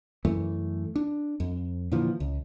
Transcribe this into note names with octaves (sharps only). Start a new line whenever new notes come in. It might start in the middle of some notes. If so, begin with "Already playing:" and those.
F#2 E3 A3
D4
F2
A#2 D3 E3 F3
C#2